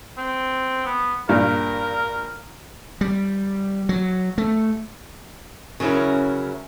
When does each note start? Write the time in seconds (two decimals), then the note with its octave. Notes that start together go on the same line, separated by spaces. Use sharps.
0.17 C4
0.86 B3
1.29 G2 A#2 A#4
3.01 G3
3.89 F#3
4.38 A3
5.80 C#3 F#3 C#4 E4 A#4